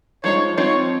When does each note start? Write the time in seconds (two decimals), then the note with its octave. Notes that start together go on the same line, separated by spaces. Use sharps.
0.24 F3 G#3 D#4 C#5
0.57 F3 C4 D#4 C#5